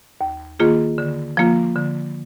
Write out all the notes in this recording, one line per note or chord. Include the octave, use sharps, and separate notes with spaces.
D#2
D#3 A#3 F4 G#4
D3
F3 A#3 F4
D3